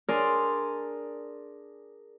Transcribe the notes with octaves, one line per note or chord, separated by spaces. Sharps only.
D4 G#4 A#4 D5 G#5 C6